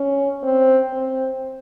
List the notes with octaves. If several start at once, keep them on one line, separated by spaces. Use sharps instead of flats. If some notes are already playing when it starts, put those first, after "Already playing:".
Already playing: C#4
C4
C4